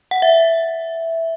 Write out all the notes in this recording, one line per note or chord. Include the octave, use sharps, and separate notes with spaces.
F#5
E5